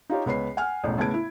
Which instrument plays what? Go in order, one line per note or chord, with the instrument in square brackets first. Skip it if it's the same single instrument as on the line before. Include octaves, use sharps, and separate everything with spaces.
[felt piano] D#4 F4 G4 C#5
C#2 B3 C#5 B5 C7
F#5 G#5 F6
E1 A1
A2 C#3 B3 A5 G#6 D7
E4